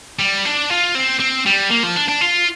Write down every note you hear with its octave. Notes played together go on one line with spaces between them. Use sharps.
G3
D4
F4
C4
C4
G3
A#3
F3
D4
D4
F4